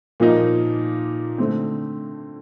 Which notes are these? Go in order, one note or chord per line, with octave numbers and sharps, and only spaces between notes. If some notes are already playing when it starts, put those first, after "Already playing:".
A#2 F3 A#3 D#4
D3 A3 C4